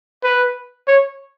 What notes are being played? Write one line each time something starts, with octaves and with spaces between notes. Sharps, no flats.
B4
C#5